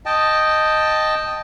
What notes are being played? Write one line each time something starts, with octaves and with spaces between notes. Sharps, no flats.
D#5 G5 A5